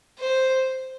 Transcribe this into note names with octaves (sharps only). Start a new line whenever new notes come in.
C5